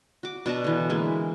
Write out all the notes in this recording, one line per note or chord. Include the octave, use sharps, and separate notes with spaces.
F#4 D6
B2 D4 A5 A#5
D3 E3
E3 G#3 A#3